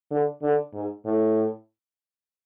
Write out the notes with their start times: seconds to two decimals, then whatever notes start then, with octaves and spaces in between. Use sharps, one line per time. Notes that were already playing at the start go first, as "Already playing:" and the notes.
0.11 D3
0.42 D3
0.73 G#2
1.05 A2